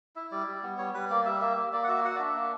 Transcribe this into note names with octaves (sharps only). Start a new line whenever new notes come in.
E4 E5
G3 D5
G3
B3
G3 C#5
G3 B4
A#3 D5
G3 E5
A#3 E5
A#3
A#3 D5
F#5
F#4 E5
F#4 F#5
D5
D4 E5
A#3